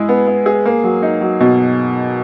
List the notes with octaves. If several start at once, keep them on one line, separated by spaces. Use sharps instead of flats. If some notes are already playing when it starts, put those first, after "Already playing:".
Already playing: G#3 E4 G#4
B3
B3
G#4
A#3
F#3
D#4
F#3
B2